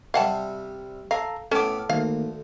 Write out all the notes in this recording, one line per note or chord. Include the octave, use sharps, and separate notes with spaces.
C3 G3 G4 F5 F#5 A5
A4 F5 A#5
A2 B3 C#4 A4 D6 F6
D2 D#3 A3 A#3 F5